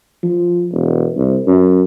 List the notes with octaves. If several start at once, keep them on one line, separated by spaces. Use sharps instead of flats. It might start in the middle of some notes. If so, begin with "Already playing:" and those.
F3
E1
C2
F#2